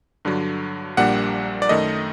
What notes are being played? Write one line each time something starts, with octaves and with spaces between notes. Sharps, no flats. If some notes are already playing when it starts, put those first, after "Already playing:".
G2 D3 F#3
A#1 A#2 G3 A#3 D4 F#5
D5
F#2 D#3 A3 D#4 D#5